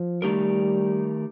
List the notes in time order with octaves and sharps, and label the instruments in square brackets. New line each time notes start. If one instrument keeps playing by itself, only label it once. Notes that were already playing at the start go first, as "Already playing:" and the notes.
Already playing: [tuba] F3
[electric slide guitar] D#3 A3 D#4 G4 A#4 [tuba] G3